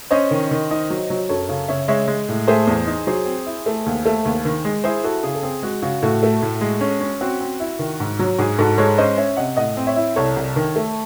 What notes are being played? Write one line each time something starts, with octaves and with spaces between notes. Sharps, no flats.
C#4 C5 D#5
D#3
D#3
D#4
F#3
F#3
F#2 A4 C#5
C#3 A4 C#5
C#3 C#5 E5
G#3 C#5 E5
G#3
A2
A3 G#4 C5
E2
D#4
F#3 G#4 C5
C4
E4
A3
D#2
A3
D#2
D#3
G#3
E4 G#4 C5
E4 F#4 A4
C#3 G#4
A4
C4 G#4
G#3 F#4
C#3 F#4
A2 F#4 A4
A3
A2
G#3
C#4
C#4
C4 F#4
C4
E4
D#3
G#2
F#3
G#2 G#4
G#2 F#4 A4
G#3 A4 C#5
C#4 C5 D#5
C#4 C#5 E5
C3 D#5 F#5
A2 D#5 F#5
C4
C#5 E5
E4
C2 A4 C#5
C2
D#3
A3